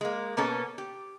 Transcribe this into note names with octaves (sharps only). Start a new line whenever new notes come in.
G#3 A#3
B2 A#3 B3 C#4 A4
G4